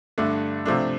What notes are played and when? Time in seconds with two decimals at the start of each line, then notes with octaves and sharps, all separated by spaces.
0.18 G2 D3 A3 D4
0.65 C3 F3 A3 D4